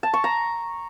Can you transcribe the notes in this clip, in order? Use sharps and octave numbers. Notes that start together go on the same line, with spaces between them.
A5
C#6
A#5